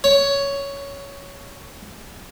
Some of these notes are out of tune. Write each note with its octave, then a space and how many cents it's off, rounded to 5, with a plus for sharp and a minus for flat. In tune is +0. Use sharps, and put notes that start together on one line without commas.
C#5 +10